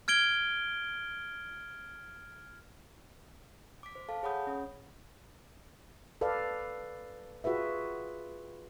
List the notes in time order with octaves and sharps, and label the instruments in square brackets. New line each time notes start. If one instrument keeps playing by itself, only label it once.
[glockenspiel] F6 G#6 D7 G7
[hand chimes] D6 B6
C5
A4 F5 A5
G#4 C#5 F#5 B5 D#6 G6
C#4 C#5
[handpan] A4 B4 D5 F5
F4 F#4 G#4 B4 E5